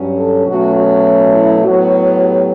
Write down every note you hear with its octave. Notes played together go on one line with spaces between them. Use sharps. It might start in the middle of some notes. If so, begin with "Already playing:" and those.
Already playing: G2 F#3 C#4
A4
B2 F#3 A3 C#4 F#4
F#4
E4
A2 F#3 B3 F#4
G4